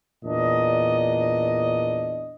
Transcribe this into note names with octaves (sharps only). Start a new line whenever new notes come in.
E2 A#2 D4 D#5